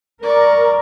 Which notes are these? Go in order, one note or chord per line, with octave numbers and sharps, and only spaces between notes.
A#4 D5 C#6